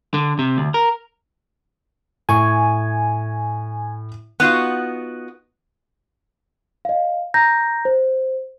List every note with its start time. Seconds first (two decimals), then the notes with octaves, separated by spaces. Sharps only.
0.14 D3
0.39 C3
0.57 D2
0.74 A#4
2.29 A2 G#5 C#6
4.40 B3 D#4 F4 F#4
6.85 D#5 F5
7.34 A#5 G6 A#6
7.85 C5